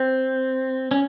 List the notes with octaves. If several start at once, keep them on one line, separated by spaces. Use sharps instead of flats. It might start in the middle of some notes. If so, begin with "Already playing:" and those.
Already playing: C4
C#4